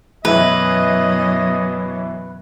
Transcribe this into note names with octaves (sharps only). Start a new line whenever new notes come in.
F#2 B2 E3 B4 D#5 E5